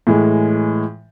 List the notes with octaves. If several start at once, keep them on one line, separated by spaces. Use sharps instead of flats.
A2 E3 G#3